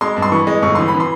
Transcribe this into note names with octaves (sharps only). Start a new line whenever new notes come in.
G#3 C6
G2
C6
E3 C#6
G#3
G1 C#6
E3 C6
B5
E3
C6